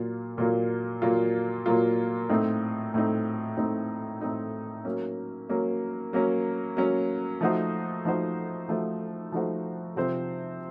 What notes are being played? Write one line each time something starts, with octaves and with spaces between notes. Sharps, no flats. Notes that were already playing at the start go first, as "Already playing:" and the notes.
Already playing: A#2 F#3 A#3 F4
A#2 F#3 A#3 F4
A#2 F#3 A#3 F4
A#2 F#3 A#3 F4
A2 A3 C4 D#4
A2 A3 C4 D#4
A2 A3 C4 D#4
A2 A3 C4 D#4
F#3 A#3 C#4
F#3 A#3 C#4
F#3 A#3 C#4
F#3 A#3 C#4
F3 A3 D#4 F#4 C5
F3 A3 D#4 F#4 C5
F3 A3 D#4 F#4 C5
F3 A3 D#4 F#4 C5
C3 F3 C4 F4 C5